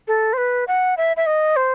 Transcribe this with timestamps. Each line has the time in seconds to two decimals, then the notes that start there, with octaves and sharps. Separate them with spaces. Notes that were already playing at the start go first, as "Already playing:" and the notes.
0.08 A4
0.33 C5
0.38 B4
0.68 F#5
0.97 E5
1.17 E5
1.26 D#5
1.56 C5